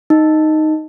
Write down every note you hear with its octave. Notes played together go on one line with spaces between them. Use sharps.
D#4